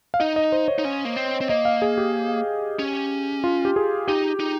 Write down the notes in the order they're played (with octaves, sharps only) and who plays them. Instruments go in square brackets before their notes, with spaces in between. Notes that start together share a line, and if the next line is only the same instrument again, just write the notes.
[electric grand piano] F5
[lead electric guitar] D#4 [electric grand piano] D#5
[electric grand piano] D#5
C5
C#5
[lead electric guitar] D#4
C#4
A#3
C4
C4
[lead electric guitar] A#3 [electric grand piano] D#5
[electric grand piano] F5
G#4
G4
[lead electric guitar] C#4
[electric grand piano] F4
G4
G#4
[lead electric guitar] D#4 [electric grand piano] G4
[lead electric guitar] D#4